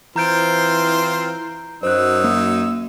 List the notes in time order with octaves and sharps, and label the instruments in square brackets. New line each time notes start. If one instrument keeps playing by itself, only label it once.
[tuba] E3 [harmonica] C4 F4 C5 [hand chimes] A#5 G6 D7
[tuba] F#2 [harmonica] F#3 D#4 E6 [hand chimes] C5 F#6
[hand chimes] A#3